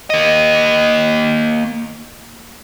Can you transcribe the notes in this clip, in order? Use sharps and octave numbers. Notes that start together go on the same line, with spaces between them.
A#3 D#5